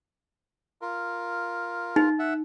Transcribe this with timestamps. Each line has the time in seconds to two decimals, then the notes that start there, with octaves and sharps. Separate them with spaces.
0.82 F4 A#4
1.96 D#4
2.19 E5 F#5